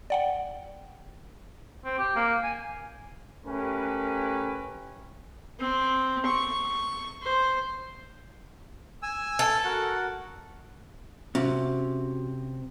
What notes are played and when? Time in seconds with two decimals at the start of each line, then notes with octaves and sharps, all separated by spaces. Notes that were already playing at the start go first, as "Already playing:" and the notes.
0.10 D5 F#5 G5
1.85 C4
1.99 G4
2.16 A#3
2.43 G#5
3.45 A3 C#4 G4 A#4 B4
5.59 C4
6.26 C#6
7.23 C5
9.03 G#5 E6
9.39 A4
9.65 F#4 A#4 F#5
11.35 C3 C#4 F#4 E5